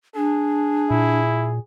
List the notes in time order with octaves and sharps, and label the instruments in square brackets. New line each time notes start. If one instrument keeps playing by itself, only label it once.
[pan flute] D4 [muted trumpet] G#4
[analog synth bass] A#2 [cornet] E4